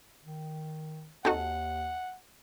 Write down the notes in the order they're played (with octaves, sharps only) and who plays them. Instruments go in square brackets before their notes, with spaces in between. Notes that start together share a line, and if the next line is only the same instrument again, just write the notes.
[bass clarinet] D#3
[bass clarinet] D#2 [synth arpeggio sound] C4 D#4 F#4 [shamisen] A4 D#5 [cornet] F#5